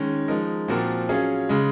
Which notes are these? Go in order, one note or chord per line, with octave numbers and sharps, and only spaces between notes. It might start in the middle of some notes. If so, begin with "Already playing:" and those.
Already playing: D#3 G#3 C#4
F3 G#3 D#4 A#4
A#2 F3 C4 F#4 A#4
F#3 C#4 F4 G#4
C#3 G#3